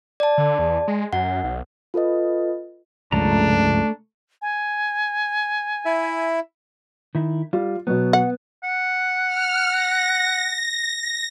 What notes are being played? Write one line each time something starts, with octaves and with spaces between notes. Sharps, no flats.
D5 A5
D3
E2
G#3
F#2 F#5
B1
F4 A4 B4 D#5
C#2 G2 C#3 F3 A3 D4 A#5
G#5
E4 E5
D#3 E4
G3 F4
B2 F#3 B3
F#5
F#5
F6
A#6